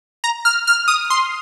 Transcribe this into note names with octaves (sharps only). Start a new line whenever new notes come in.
A#5
F6
F6
D#6
C6